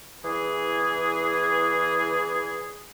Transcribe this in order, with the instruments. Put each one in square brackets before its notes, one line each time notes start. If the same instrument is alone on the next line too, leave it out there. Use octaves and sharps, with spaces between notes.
[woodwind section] E2 E3 G#4